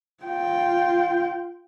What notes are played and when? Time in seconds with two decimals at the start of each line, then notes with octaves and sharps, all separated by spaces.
0.24 F4 G5